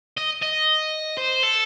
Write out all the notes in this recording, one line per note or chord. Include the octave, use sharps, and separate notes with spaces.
D#5
D#5
C5
A4